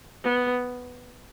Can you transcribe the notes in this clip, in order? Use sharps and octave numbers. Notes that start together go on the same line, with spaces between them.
B3